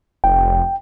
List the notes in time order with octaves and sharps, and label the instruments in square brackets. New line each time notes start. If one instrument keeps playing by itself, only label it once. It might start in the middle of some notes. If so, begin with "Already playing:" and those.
[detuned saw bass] F1 [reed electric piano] G5